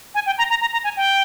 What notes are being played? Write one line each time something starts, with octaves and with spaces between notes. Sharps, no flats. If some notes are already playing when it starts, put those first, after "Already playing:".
G#5
G5
A#5
A#5
A#5
A#5
G#5
G5